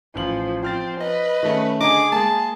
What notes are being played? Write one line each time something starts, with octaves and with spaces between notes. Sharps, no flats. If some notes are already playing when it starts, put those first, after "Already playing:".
A1 F3 F#7
F3 C4 F6 A6
B4 D#5
D#3 A3 C#4
D3 G#4 D#5 A#5 D6
G#3 A#3 A5